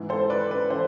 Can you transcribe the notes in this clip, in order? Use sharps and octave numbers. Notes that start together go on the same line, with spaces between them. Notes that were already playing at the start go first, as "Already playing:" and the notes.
Already playing: G#2 E3
A4 C5
B4 D5
B4 D5
E3 A4 C5